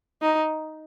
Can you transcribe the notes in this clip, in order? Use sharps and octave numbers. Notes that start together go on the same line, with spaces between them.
D#4